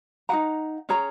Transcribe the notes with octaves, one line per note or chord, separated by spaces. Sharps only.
D#4 G#4 F#5 A#5
C#4 G#4 C#5 A#5